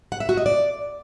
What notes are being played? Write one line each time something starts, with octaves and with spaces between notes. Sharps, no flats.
F#5
E5
F#4
D#5
D5